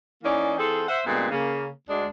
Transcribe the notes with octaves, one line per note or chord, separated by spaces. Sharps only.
E3 A#3 C#4 D#4 D5
E3 C4 F4 G#4 A4
C5 E5 F#5
G2 A#2 D3 G#3 B3 C4
C#3 A#3
D2 G#3 D4